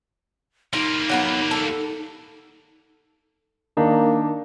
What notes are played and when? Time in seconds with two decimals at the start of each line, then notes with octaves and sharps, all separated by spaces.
0.73 G3 A#3 D#4 F4
1.09 F#3 B3 B4
1.51 A4
3.77 D#3 A#3 D4 D#4